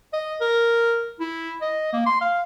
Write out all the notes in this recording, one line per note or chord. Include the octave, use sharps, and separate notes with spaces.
D#5
A#4
E4
D#5
A#3
C6
F5